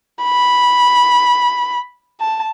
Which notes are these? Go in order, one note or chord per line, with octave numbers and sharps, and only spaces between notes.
B5
A5